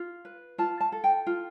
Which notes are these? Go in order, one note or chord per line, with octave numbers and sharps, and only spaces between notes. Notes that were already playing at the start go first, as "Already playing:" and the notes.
Already playing: F4
B4
F4 A5
A5
A4
G5
F4